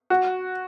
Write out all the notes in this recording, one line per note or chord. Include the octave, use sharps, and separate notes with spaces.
F#4